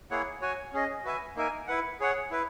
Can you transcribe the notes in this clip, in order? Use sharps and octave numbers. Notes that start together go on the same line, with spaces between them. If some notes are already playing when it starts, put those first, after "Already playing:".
A#3 E4 G#4 C#5 F#5
F#4 C#5 G#5
C#4 G#4 D#5
F#4 B4 E5 G#5
A#3 D#4 A#4 E5 G#5
E4 B4 F#5
G#4 C#5 F#5
E4 B4